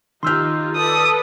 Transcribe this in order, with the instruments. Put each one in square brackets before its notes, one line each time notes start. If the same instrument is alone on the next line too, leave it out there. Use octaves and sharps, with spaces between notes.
[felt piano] D#3 F6 [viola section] D#4 F4 G4 [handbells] C6 E6 G6
[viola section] A4 B4 D5 [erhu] D#6